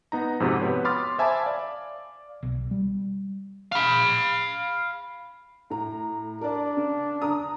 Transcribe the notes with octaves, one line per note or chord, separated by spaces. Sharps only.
B3 D#4 A#5
F2 G#2 C3 F#4
B3 G4 B4 C#5
B5 C6 D6 D#6 F6 A6
C5 E5 G#5 A5 B5 D6
D5 F5
B1
G3
F5 B5
A2 A#5
D4 A#4 D5
C#3
D3 A#5 D#6